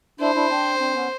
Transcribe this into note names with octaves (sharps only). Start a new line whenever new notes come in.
D4 E4 C5
D4 E4
C4 D4
C4 D4
B3 C#4